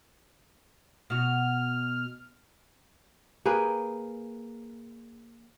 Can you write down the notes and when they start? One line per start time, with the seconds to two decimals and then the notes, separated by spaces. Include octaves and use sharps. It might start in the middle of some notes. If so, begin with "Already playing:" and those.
1.10 B2 F#4 F6
3.45 A#3 G#4 B4 G5